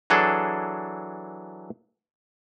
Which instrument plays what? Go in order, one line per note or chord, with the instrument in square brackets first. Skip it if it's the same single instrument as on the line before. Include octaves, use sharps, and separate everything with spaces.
[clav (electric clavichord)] E3 F#3 D4 G#4 A4